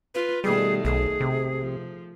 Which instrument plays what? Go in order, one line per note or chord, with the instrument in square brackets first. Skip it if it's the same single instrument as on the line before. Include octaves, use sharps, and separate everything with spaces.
[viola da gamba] F4 [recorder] B4
[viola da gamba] B2 D#3 A3 [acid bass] G3 [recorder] G#4
[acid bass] B1 [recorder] G#4
[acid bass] C3
[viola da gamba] F3